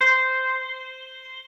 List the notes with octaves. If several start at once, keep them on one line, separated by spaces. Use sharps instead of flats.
C5